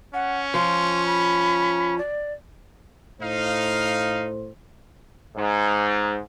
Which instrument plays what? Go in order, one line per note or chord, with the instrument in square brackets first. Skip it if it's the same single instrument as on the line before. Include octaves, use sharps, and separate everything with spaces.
[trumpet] C#4 [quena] F#5
[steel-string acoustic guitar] F3 [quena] C6
[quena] B5
D5
[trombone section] A2 C5 [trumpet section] D#4 F5
[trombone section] G#2